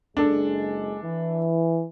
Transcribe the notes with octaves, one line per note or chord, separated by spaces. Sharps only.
F#1 G#3 D4 A4
E3